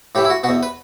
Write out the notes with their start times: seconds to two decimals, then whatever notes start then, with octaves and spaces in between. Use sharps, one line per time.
0.15 A2 E3 G4
0.25 E4
0.30 F#4
0.44 B2 F#4
0.49 E2
0.63 B4